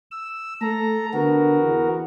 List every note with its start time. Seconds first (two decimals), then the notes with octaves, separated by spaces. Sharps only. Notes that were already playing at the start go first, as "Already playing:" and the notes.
0.11 E6
0.61 A3 A4 A#5
1.13 D3 B3 F#4 A#4
1.62 E2